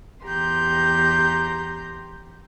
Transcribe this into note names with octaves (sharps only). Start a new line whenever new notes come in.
E2 G4 A#5 C6 G6